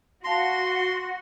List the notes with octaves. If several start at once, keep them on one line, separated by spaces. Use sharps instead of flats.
F#4 F5 A5 C6 A#6